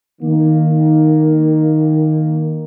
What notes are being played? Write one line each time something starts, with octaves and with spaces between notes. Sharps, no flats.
D#3 A#3